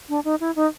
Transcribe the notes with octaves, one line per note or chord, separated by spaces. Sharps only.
D4
D#4
E4
D#4